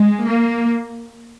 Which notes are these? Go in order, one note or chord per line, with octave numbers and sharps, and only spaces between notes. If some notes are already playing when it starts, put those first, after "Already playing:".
Already playing: G#3
A#3